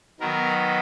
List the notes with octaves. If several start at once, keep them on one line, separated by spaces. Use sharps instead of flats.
D#3 F#3 B3 A#4